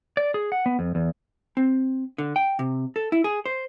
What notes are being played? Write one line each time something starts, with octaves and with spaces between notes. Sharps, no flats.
D5
G#4
F#5
B3
F2
E2
C4
D3
G5
C3
A4
E4
G#4
C5